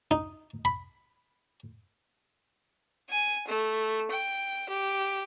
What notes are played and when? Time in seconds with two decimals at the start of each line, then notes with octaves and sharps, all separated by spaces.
0.11 D#4
0.65 B5
3.09 G#5
3.47 A3
4.11 G5
4.68 G4